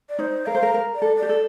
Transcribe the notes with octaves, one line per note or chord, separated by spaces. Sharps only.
D5
D#4 C5
A#4 F5
C5
A#4
A#4
D5
A4
D5
G4
A4